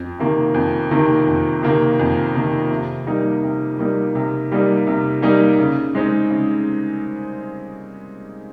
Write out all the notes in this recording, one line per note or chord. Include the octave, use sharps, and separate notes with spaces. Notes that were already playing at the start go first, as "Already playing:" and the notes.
Already playing: F2
C3 D#3 A#3
F2
C3 D#3 A#3
F2
C3 D#3 A#3
F2
C3 D#3 A#3
C3
G3 A#3 D#4
C3
G3 A#3 D#4
C3
G3 A#3 D#4
C3
G3 A#3 D#4
C#3
G#3 C4 D#4
C#3